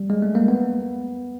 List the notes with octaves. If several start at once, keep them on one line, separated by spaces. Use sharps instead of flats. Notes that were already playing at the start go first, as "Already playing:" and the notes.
Already playing: G3
G#3
A3
A#3
B3